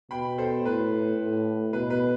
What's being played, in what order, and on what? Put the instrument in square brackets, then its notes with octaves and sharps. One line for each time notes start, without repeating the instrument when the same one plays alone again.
[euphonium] B2 [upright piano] G5 B5
[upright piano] A4 C5
[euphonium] A2 [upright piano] B4
[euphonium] A2
[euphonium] B2 [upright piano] B4
[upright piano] B4